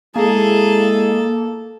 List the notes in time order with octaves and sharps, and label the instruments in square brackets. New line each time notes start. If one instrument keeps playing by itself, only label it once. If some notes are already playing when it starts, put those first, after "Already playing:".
[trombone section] G#3 E4 [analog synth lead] A#3 [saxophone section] G#4 [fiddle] A4